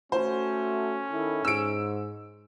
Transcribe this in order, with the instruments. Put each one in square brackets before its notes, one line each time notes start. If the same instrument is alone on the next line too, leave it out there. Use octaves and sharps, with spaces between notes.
[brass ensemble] A3 F#4 [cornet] C#4 [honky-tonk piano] C5
[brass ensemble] D#3 E4 A4
[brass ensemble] G#2 [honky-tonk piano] E6 D7